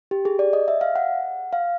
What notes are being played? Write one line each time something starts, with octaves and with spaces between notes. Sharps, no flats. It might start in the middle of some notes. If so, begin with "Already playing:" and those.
G4
G#4
D5
D#5
E5
F5
F#5
F5